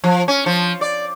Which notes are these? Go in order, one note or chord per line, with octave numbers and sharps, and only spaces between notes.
F3
C#4
F3
D5